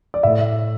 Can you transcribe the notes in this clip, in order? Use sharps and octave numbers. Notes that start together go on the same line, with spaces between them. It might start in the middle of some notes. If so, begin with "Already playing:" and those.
D5
A2 E5